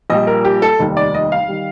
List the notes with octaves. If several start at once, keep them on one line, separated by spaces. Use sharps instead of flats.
A#1 A#2 G3 D#5
A#4
G4
A4
F1 D#2 D#3 G3
D5
D#5
F5
D#3 G3